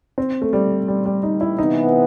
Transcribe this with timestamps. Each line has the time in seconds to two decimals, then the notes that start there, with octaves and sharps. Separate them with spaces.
0.18 C4
0.42 A3
0.53 G3
0.88 G3
1.06 G3
1.23 D#4
1.41 E4
1.58 C3 E3 B3 D#4